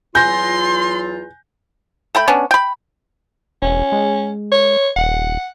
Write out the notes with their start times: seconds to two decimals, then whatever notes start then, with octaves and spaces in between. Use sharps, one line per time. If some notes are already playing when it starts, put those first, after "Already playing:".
0.15 E2 F#3 F4 G#5 C6 G6 A#6
2.15 A3 G5 B5
2.28 B3 C#4 D4
2.51 G5 B5
3.62 E1 C#4
3.92 G#3
4.52 C#5
4.96 D#1 F#5